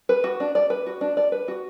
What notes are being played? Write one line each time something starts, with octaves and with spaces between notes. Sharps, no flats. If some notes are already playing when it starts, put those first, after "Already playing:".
B4
F#4
D4
D5
B4
F#4
D4
D5
B4
F#4